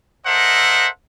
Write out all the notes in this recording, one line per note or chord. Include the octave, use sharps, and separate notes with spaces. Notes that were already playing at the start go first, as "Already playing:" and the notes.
A4 A#4 C5 D#5 E5 F#5